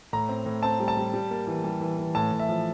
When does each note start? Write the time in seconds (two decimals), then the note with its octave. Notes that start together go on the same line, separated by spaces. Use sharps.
0.13 A2 A#5
0.29 C4
0.46 A2
0.63 C4 A5
0.80 G3
0.88 A5
0.97 G3
1.14 G3
1.31 A#3
1.47 E3
1.64 G3
1.81 E3
1.98 E3
2.15 A2 A5
2.32 A2
2.39 E5
2.49 F3